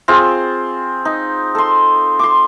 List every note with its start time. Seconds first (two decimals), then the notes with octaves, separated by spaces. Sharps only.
0.08 C4 F4 G#4
1.05 D#4
1.55 A4 C6
2.19 C6 D6